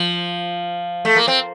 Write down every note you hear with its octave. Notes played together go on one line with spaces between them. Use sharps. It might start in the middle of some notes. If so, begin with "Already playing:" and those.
Already playing: F3
A3
A#3
C4